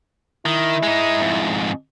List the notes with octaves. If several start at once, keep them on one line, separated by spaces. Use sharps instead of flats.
D#3 E4
G#3 D#4
F2 G#2